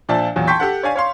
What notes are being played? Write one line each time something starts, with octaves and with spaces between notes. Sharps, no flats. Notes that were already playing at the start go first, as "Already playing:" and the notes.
A#2 F3 D4 D5 E5 A5
E2 A#2 F#3
G5 A5 C6 C#6 G6 B6
G4 A4 F#5
C#5 D5 F5 G#5
C#5 F5 C6